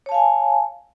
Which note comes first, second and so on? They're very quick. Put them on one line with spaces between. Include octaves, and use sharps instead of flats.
C#5 A5 F5 G#5